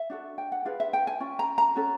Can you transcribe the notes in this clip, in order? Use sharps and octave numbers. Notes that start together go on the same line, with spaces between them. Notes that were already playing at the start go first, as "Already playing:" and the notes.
Already playing: E5
D4 F#4 A4
G5
F#5
D4 F4 G#4 B4 F5
E5
G5
G#5
C#4 F4
A#5
A#5
C#4 F#4 A4